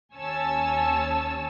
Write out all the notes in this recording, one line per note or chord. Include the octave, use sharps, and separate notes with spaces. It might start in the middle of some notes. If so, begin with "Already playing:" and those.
D#2 C#4 C#5 G#5 A5 E6